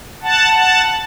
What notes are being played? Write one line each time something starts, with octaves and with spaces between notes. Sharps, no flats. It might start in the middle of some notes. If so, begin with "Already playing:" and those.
F#5 A5
F#5 A5